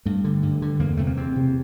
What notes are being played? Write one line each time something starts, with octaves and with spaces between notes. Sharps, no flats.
G2 A3
D3
G2
D3
E2 A#3
C3 A3
A#3
E2 C4
C3